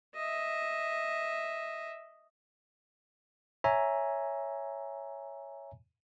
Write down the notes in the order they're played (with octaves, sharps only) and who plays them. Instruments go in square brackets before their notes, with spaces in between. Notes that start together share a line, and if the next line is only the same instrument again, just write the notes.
[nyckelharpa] D#5 E5
[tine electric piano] C#5 E5 G#5 A#5